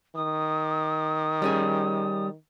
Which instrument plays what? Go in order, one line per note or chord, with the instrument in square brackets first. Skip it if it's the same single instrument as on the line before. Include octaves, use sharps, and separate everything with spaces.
[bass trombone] D#3 [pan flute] D#6
[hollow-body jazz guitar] G3 C#4 G#4